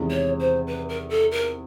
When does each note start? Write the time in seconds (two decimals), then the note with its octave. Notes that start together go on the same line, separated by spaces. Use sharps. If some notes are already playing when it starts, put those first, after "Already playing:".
Already playing: E2 C3 D#3 G#3
0.10 C#5
0.40 C5
0.67 B4
0.89 A#4
1.10 A4
1.32 A#4